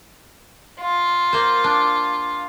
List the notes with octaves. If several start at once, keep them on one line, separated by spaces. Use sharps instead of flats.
F4
A#3 C5
D4